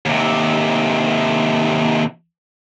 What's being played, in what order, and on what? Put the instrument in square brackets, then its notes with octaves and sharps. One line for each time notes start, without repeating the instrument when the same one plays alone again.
[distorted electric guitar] D#2 C3